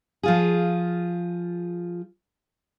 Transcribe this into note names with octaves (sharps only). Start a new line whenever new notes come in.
F3 F4 G#4